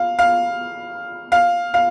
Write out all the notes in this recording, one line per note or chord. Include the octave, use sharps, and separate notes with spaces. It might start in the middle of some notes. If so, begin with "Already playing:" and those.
Already playing: F5
F5
F5
F5